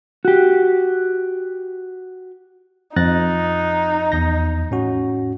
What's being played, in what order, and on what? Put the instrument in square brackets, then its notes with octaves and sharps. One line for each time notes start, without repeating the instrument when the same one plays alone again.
[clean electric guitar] F#4 G4
[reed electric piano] F2 [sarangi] D#4 [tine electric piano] F#6 A6 A#6
[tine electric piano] E2 G6 A#6
A2 C#4 F#4